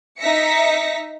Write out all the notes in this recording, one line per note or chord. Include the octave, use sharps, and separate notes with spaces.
D#4 E5 A#6 B6 C#7